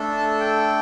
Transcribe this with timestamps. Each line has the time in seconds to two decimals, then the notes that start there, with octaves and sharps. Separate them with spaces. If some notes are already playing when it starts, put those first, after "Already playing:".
Already playing: A3 D4 A4
0.17 A5
0.40 G5